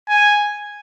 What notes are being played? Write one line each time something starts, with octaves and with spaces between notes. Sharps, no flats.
G#5